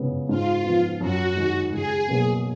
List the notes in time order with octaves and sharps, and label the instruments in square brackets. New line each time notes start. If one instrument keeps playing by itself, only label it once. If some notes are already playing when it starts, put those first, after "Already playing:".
Already playing: [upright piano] F#2 C#3 G#3 B3
[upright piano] G#2 [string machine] F4
[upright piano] F3 B3
[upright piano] F#2 [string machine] F#4
[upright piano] D#3 G#3 D#4
[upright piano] C#2 [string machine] G#4
[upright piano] B2 F#3 A#3